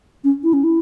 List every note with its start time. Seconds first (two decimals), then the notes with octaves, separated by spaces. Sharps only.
0.24 C#4
0.43 E4
0.53 C#4
0.64 E4